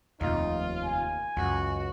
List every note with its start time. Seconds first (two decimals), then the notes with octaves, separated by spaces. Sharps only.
0.21 F1 D#2 C3 D#4 F4
0.85 G#5
1.37 C#2 F#2 F#4